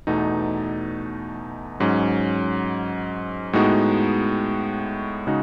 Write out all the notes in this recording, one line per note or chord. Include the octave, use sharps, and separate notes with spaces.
E2 B2 A3 D#4
G#2 F#3 C#4
A2 G#3 B3 D#4 F#4
C#3 G#3 D#4 F#4